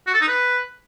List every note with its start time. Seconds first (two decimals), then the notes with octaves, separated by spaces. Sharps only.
0.07 F#4
0.14 A4
0.21 D#4
0.28 B4